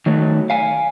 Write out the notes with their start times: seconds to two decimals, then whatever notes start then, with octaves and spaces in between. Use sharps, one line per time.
0.06 D#3 F#3 A3
0.50 F5 G#5